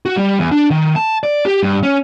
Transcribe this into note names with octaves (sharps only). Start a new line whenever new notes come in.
F#4
G3
E2
D4
D#3
A5
D5
G4
G2
C#4